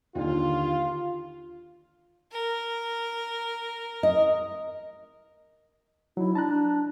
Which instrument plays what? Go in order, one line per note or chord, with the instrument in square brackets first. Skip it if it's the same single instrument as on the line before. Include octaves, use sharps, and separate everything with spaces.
[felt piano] D#2 D3 [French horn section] F4
[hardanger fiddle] A#4
[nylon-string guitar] D#5
[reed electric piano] F#3 D#4 [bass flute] E4
[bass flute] D4 [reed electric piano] A5 A#5 F#6